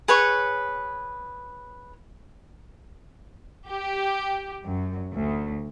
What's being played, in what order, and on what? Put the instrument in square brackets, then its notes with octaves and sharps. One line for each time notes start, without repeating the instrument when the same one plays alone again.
[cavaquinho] G#4 B4 C#5 C#6
[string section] G4
F#2
D2